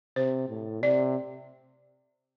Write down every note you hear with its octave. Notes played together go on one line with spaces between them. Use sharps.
C3 C5
A2
C3 D5